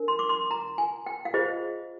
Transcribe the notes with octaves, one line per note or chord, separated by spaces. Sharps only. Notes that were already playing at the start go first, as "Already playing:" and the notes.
Already playing: D4 A#4
C6
D6
C6
A#5
G#5
G5
F5
F4 G#4 C5 D#5